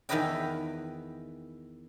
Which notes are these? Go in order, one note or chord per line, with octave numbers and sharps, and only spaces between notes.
E2 D#3 E4 B4 D#5 G5